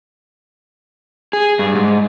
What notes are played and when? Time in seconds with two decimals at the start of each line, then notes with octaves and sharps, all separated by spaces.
1.33 G#4
1.59 G2
1.75 G#2